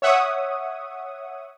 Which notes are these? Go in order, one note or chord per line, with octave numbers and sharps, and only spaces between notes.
C#5 E5 F#5 C#6 D#6